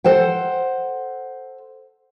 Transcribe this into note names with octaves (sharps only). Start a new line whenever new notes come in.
A4 C5 F#5 G5